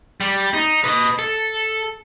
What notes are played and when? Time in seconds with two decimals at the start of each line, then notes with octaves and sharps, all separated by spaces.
0.21 G3
0.54 D#4
0.84 B4 D#5
1.19 A4